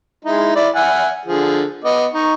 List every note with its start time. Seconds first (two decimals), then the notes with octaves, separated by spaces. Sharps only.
0.25 G#3 D#4 E4
0.56 E4 D5
0.76 E5 F#5 G#5
1.25 D3 F3 G#4
1.84 B3 D#5 D6
2.14 D#4 C#6